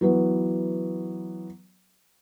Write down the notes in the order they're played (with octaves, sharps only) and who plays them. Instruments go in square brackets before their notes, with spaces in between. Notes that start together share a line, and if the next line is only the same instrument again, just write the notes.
[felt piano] E3 F#3 B3